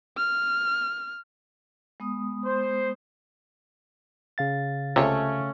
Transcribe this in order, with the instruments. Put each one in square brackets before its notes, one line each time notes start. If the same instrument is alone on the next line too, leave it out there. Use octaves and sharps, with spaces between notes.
[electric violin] F6
[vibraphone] G#3 B3 D#6
[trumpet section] C5
[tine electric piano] C#3 F5 A6
[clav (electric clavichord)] C#2 C3 [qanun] A3 C#4 C#5